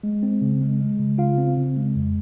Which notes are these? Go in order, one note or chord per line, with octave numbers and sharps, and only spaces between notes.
G#3
C4
C#3
G#3
G#3
C#3
C#3 F4 F5
C4
C#3
G#3
F2